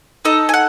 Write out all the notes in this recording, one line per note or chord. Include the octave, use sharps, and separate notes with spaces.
D#4 A4 D#5
G#5
F#5